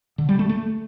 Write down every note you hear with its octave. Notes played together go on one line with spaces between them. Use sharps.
D3
G3
A3
A3